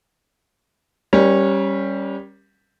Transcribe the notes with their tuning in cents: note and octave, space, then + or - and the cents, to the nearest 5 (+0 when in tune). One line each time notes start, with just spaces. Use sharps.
G3 +0 C#4 -15 A#4 +30